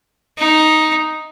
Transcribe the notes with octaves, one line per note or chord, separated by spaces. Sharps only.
D#4